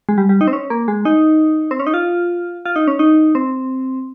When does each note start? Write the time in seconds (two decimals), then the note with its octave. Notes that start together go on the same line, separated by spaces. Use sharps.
0.09 G#3
0.18 G3
0.29 G3
0.41 D#4
0.48 C4
0.53 C#4
0.70 A#3
0.88 G#3
1.05 D#4
1.71 C4
1.79 C#4
1.87 D#4
1.94 F4
2.65 F4
2.76 D#4
2.88 C#4
2.99 D#4
3.35 C4